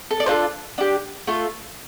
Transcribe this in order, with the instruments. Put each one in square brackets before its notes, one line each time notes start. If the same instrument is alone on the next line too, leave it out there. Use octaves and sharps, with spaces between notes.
[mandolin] A4
D5
D4 F4 A4 C5
D4 G4
A3 F4 A4